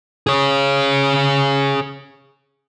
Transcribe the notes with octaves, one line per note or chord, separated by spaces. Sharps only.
G#4 C#5